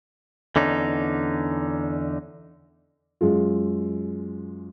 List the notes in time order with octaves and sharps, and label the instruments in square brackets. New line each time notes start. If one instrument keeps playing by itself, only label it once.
[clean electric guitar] E2 D3 C#4 D#4
[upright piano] F#2 G#3 F4